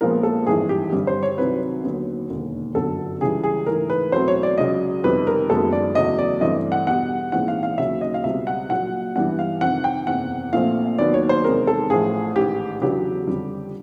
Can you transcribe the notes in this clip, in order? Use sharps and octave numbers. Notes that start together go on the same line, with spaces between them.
A#1 A#2 F3 G#3 B3 A#4
A4
G#1 G2 E3 G#4
G4
G2 D3 G3 C4
C5
C#5
C2 C3 D#3 F#3 B4
D#2 D3 F#3 B3
E1 D#2 D3
G1 F#2 D3 F#3 B3 A4
C#2 C#3 E3 G3 G#4
G#4
G#2 E3 A3 A#4
B4
E2 B2 F#3 A3 C4 C5
C#5
D5
C#2 C#3 F#3 D#5
F2 C3 D#3 G3 B3 B4
A#4
F#1 F#2 D#3 G#3 B3 A4
D5
E2 C#3 F#3 A3 D#5
D5
G2 E3 A3 C4 D#5
F#5
E2 B2 G3 F#5
A#1 G#2 E3 G#3 C4 F#5
F5
F5
D#2 C#3 F#3 E5
D#5
F5
C#2 B2 G3 C4 E5
F#5
A#1 A#2 F#3 F#5
G2 E3 G3 B3 D4 F#5
F5
F2 C3 D#3 F#5
G5
F#1 E2 C3 F#5
A#1 A#2 F3 A3 C4 F5
D#2 D#3 F#3 B3 D5
C#5
C5
E2 C3 D#3 G#3 A#4
A4
A1 A2 F3 G#4
A1 G#2 D#3 G4
E2 C#3 F#3 B3 D4 G4
F2 D3 G3